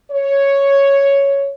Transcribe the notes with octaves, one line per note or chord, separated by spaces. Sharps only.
C#5